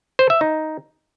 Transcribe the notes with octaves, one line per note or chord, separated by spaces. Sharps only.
C5
E5
D#4